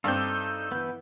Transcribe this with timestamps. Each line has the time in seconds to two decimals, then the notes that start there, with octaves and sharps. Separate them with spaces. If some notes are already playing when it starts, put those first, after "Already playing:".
0.04 G2 C4 D#4 A4 D5 E6 G6
0.72 E3 B3